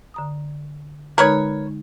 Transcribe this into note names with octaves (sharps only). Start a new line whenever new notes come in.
D3 A#5 D#6
D3 G#3 D#4 A#4 B4 C#5